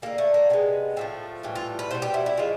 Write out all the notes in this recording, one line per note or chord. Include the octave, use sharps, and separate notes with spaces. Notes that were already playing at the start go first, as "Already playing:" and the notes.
D3 G3 A#3
A3
A#3
C3 D#3 G#3 B3
A2 F3 A3 C4
A2 E3 G3
F4
B4
B2 G3 C5
G4
E4
E4
C#3 F3 G#3 F4